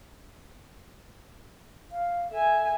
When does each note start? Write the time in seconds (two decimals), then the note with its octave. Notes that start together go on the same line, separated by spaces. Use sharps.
1.92 F5
2.31 A4 E5 G#5